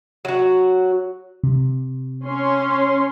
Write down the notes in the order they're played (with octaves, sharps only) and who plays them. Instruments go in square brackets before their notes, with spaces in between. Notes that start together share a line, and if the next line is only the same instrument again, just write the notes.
[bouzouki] F#3 F#4
[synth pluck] C3
[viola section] C#4 C#5 C6